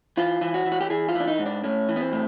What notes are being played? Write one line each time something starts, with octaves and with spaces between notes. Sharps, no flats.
E3 F4
E3
F#4
E3
F#4
G4
E3 G#4
F4
E3 D4
D#4
G#2
D4
A2 C#4
E3
B3
C4
A2